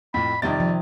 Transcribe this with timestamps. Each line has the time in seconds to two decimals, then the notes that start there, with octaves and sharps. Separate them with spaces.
0.14 F2 A2 B5
0.42 F2 C3 D#3 G3 D5 A6
0.60 F3